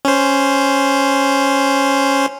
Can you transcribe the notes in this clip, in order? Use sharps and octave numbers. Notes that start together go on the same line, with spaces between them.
C#4 C5